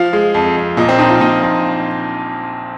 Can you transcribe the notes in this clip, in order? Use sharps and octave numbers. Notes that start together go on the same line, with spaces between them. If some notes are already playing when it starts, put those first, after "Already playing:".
Already playing: F3 F5
G#3
F2
F2
A#2 D#5
C4
A#1 D#4
F4
A#2 D#4
A#1